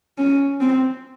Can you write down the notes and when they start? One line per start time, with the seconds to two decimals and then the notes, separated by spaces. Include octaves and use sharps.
0.18 C#4
0.61 C4